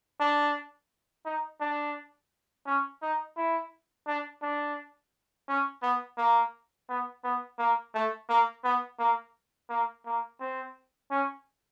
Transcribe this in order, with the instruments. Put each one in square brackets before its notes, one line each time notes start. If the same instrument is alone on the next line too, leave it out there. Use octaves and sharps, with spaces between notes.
[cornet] D4
D#4
D4
C#4
D#4
E4
D4
D4
C#4
B3
A#3
B3
B3
A#3
A3
A#3
B3
A#3
A#3
A#3
C4
C#4